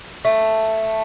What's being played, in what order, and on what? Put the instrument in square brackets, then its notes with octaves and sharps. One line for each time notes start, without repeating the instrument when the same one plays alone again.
[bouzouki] A3